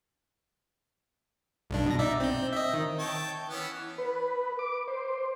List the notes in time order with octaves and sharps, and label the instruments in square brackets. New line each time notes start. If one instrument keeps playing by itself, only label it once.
[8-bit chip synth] B1 G2 D4
B2 A#6
D#4 D5 E5
C4 G6
D#5 E5
D#3
[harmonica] C#5 G5 A5
E3 B3 C#4
[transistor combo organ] B4
D6
C5